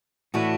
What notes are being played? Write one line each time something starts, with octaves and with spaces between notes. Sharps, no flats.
A2 E3 A3 D4 E4 F#4 B4